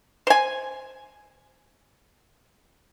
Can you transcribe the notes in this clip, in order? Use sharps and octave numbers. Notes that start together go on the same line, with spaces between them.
C5 G#5